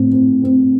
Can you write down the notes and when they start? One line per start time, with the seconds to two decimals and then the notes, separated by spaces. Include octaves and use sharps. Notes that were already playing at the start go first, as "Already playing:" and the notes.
Already playing: A2 C4
0.12 C4
0.43 C4